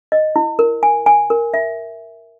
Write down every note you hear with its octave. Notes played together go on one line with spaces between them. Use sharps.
D#5
E4
A#4
G#5
G#5
A#4
E5